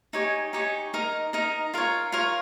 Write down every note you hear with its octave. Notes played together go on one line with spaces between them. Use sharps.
D#4 G4 C#5 G#5
D#4 G4 C#5 G#5
D#4 A#4 D#5
D#4 A#4 D#5
F4 A#4 C#5
F4 A#4 C#5